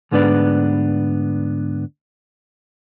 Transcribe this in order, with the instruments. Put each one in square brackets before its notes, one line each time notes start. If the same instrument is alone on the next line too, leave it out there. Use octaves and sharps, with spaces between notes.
[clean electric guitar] D2 G#2 B3 D4 B4 D5